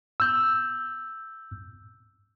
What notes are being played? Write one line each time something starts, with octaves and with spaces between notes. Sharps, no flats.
E6 G6